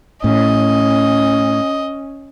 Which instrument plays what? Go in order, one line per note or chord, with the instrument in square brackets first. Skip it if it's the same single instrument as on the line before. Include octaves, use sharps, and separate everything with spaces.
[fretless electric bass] A2 [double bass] C#4 [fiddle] D#5